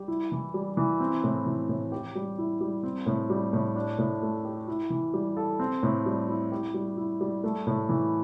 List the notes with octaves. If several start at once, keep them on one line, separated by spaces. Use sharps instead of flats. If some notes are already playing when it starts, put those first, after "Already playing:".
Already playing: G3 G4
E4
E3
G3
E3
C4
A2
E3
A2
G4
G3
E4
G3
C4
A2
G3
A2
D4
A2
A3
G4
E4
E3
G3
A4
C4
A2
G3
E4
G4
G3
E4
G3
A3
A2
E3